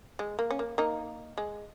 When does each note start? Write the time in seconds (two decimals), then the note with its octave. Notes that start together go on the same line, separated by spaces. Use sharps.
0.19 G#3
0.39 A#3
0.50 C#4
0.59 A#3
0.78 A#3 D#4
1.38 G#3